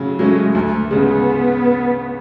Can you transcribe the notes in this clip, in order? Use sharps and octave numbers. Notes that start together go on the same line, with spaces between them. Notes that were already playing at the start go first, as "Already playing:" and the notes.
Already playing: C#3 F#3 A3
F#3 G#3 A3 C#4
D2 A3
C#3 G#3 B3